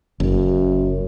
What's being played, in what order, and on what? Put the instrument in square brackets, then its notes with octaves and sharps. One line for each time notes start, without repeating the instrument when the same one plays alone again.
[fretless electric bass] F#1 [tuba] F#2